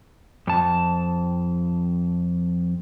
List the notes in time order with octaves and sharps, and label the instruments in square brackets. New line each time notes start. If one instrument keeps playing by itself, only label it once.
[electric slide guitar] F2 A5